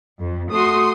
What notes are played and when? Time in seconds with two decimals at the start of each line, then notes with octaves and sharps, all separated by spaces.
0.20 F2
0.51 A3 F#4 C6 D#6